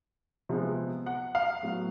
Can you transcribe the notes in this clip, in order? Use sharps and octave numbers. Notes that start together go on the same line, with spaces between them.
C3 F3 G#3 B3
F#5
F5
A2 F#3 B3